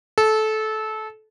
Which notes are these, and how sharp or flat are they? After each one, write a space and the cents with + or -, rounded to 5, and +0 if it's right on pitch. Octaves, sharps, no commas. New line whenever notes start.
A4 -20